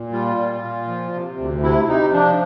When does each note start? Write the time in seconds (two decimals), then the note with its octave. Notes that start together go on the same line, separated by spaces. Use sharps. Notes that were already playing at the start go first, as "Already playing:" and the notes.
Already playing: A#2
0.12 G3 F4
0.37 A#2
0.63 A#2
0.87 F3
1.13 C3
1.38 D2
1.63 C3 E4
1.88 C3 D#4
2.13 F3 D4